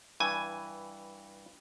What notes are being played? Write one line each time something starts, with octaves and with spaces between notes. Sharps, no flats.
G2 E3 G#5